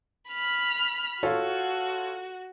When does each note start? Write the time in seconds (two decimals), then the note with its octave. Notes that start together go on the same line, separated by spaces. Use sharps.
0.30 B5 F6
1.23 F4 F#4 A4 C#5